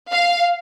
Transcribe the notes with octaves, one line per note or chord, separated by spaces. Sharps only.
F5